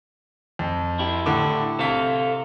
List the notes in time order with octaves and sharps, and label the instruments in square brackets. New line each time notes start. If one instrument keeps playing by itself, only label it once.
[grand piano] F2
[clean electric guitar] E4 G4
[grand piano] A2 D3 D6
[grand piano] C3 B6 [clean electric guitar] A4 F5